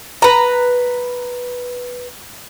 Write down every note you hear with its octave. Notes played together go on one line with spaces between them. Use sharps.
B4 A#5